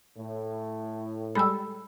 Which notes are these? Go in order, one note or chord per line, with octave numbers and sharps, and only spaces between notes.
A2
G3 G#3 A4 B5 E6